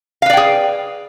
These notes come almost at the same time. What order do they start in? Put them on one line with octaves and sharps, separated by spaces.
F5 B4 D5 G5 G#4